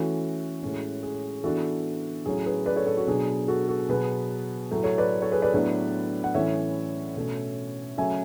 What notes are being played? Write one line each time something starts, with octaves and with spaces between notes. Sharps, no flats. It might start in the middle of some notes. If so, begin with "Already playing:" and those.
Already playing: E3 A3 C#4 F#4
A2 G#3 C#4
G#4
E3 B3 D4 F#4 A4
A2 F#3 C#4 G#4
G#4 B4
B4 D5
A4 C#5
A4 C#5
F#4
B2 F#3 B3 D4 G#4
F#4 A4
F#4 A4
B2 F#3 B3 G#4 B4
A2 F#3 A3
A4 C#5
B4 D5
A4 C#5
G#4 B4
B4 D5
A2 F#3 B3 D4
F#5
A2 E3 A3 C#4 C#5 E5
B2 A3 C#4
C#3 F#3 A3 C#4 E5 G#5